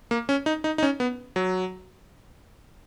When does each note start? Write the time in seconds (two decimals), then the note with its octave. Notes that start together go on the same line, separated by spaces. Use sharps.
0.11 A#3
0.29 C#4
0.46 D#4
0.64 D#4
0.78 D#4
0.83 C#4
1.00 B3
1.36 F#3